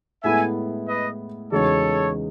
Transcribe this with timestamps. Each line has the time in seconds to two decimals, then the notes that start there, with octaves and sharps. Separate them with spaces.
0.24 A2 G#3 B3 E4 A4 E5 G#5
0.88 B4 D#5
1.52 E2 C#3 G#3 D#4 F#4 A4 C#5